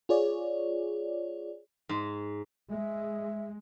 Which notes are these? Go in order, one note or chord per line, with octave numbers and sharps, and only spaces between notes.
F4 G#4 C#5 D5
G#2
G#3 E5